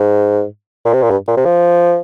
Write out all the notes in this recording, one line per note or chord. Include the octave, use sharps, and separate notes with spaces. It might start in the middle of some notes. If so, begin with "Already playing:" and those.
Already playing: G#2
A#2
C3
A#2
G2
A#2
C3
F3